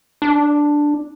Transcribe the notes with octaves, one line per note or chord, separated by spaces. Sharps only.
D4